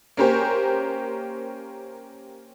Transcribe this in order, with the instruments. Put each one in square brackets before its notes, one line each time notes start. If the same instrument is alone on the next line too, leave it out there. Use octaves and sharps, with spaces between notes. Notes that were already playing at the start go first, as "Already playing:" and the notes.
[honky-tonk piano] A#3 C#4 G4 A#4 C5